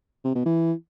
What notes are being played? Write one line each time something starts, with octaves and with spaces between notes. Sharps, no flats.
C3
B2
E3